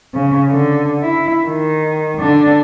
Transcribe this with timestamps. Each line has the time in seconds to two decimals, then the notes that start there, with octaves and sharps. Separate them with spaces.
0.14 C#3
0.50 D3
1.03 E4
1.47 D#3
2.20 D3 D4